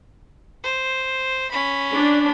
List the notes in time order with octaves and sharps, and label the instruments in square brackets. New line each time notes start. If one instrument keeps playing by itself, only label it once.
[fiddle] C5
C#4 B5
[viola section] D4